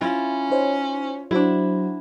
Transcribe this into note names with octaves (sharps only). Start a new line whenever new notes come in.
C#4 E4 F4
D#4 C5 C#5
F#3 D4 E4 F#4 C5